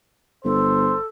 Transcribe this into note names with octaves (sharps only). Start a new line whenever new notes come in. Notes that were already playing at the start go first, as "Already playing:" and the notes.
G1 A4 C5